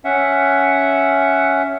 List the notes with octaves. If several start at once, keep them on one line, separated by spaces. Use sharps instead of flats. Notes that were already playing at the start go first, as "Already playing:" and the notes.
C#4 E5 F#5